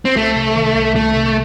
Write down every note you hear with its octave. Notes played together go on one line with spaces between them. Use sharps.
C4
C2 A3
C3
D#3
C2
C2 A3
C3